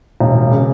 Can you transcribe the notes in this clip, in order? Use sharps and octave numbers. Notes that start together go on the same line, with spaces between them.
E1
C#3